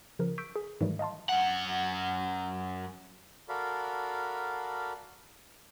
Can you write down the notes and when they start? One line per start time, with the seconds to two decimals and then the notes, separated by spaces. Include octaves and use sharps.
0.19 C#3 F3 A#4
0.38 C#6 E6 G6 B6 D7
0.56 G#4
0.81 G#2 D#3 E3 F#3 G3 A3
0.99 D#5 F5 A5 C6
1.29 F#2 F#5
3.49 F#4 A4 A#4 D5 F5 B5